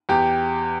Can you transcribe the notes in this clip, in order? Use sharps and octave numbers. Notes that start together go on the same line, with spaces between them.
E2 G4